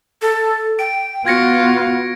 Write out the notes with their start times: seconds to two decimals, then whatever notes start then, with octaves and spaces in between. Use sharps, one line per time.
0.22 A4
0.79 G5 D7
1.26 B3 F4 F#4 G#6 A#6 C#7